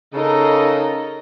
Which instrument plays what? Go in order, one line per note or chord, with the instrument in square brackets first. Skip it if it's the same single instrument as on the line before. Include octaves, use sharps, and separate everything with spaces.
[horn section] C#3 [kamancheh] D#4 A4 [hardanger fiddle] A#4 D#5